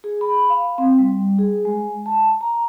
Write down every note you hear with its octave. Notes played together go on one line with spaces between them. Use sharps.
G#4
B5
F5
C4
G3
G#4
G#3
A5
A#5